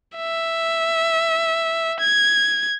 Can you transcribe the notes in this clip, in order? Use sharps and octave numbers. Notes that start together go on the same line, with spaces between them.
E5
G#6